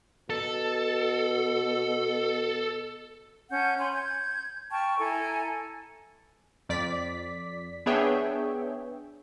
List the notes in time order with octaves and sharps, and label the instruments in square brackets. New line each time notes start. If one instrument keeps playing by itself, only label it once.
[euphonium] B2 [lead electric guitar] A4
[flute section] C#4 F#5 A5 G6
C#5 G#5 B5 C6
G6 G#6
G5 A5 C#6 F6
E4 A4 G#5 A#5
[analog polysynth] F2 D5 B6
B3 D4 G#4 C#5 E5 G5